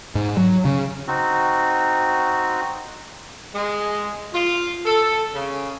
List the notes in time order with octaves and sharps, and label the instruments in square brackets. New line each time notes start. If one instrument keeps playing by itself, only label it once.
[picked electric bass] G#2
F#3
C#3
[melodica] C4 D#4 F#4
[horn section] G#3
F4
A4
C#3